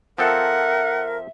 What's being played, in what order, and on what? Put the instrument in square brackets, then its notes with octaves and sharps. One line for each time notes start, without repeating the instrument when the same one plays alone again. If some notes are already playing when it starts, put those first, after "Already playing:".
[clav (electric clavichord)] F3 C4 A4 [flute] A#4 [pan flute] E5 [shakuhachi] F#5